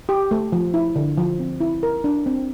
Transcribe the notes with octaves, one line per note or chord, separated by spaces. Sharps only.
G4
A3
F3
E4
D3
F3
C4
E4
A#4
D4
C4